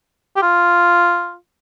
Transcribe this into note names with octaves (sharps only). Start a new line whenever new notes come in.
G4
F4